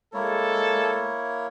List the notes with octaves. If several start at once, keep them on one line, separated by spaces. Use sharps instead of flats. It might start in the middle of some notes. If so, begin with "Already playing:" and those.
G#3 A#3 E4 A4 C#5